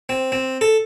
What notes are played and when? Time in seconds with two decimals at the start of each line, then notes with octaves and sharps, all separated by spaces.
0.09 C4
0.32 C4
0.61 A4